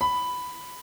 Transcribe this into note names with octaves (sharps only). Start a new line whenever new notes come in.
B5